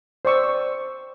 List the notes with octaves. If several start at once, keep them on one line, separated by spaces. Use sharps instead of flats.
C5 D5 C#6 E6